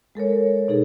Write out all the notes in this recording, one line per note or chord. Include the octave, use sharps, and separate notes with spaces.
G#3 A4 A#4 C#5
B2 D#4 G#4 A4